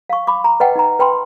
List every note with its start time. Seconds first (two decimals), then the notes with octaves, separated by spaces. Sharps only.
0.10 F5 C#6
0.27 B5 D6
0.44 A#5
0.60 B4 D#5 F#5 G5
0.76 D#4 G5 A#5
0.99 B4 G5 B5 C6